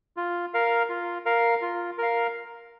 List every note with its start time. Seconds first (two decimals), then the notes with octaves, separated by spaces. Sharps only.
0.17 F4
0.54 A#4 F5
0.89 F4
1.26 A#4 F5
1.62 F4
1.98 A#4 F5